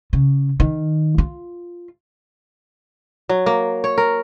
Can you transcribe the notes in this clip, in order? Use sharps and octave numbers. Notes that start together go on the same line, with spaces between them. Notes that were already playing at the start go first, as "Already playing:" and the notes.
C#3
D#3
F4
F#3
A#3
C#5
A#4